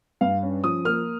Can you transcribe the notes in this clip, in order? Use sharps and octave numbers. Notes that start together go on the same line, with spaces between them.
G2 F5
C#4
F3 D#6
A#3 F6